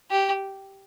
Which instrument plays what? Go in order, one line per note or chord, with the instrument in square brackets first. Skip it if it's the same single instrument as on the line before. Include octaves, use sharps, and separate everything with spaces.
[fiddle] G4